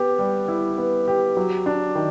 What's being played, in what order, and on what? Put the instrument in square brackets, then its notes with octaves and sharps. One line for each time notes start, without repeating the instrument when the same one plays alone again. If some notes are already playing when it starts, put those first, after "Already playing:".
Already playing: [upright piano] B3 G4
G3
E4
B3
G4
F#3
D4
D#3